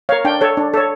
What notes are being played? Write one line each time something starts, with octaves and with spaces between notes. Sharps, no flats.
A#4 C#5 F5
D4 G5
A4 C#5
D4
A4 C#5